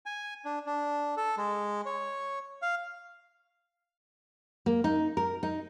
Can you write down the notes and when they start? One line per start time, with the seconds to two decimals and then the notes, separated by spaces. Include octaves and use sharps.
0.06 G#5
0.45 D4
0.66 D4
1.17 A4
1.37 G#3
1.86 C#5
2.62 F5
4.66 A#3
4.84 D#4
5.17 A#4
5.43 D#4